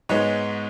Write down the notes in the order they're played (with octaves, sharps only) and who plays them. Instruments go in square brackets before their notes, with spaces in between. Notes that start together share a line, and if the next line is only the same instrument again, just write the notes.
[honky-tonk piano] G#2 G#3 B3 C#5